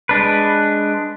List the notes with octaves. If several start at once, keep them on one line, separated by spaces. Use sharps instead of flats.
G#3 D4 B4